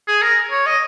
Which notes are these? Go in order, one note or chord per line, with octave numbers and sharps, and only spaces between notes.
G#4
A#4
C#5
D#5